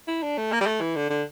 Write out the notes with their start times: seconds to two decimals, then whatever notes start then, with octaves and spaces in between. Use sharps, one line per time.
0.08 E4
0.22 D4
0.37 A3
0.52 A#3
0.61 G3
0.66 A3
0.81 E3
0.96 D3
1.10 D3